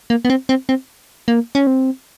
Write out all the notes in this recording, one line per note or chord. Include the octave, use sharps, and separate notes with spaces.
A#3
B3
C4
C4
C4
A#3
C#4
C4